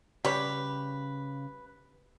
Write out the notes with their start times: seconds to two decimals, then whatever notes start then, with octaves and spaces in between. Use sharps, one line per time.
0.25 C#3 G3 G4 B4 C#5 B5